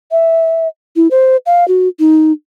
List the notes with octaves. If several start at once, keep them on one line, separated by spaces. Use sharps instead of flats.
E5
E4
C5
F5
F#4
D#4